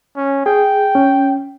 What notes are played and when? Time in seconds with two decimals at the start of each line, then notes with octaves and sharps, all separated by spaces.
0.16 C#4
0.46 G#4 G5
0.95 C#4